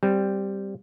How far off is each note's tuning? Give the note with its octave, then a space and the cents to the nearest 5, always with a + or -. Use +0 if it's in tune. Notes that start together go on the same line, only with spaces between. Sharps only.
G3 +0 C4 +0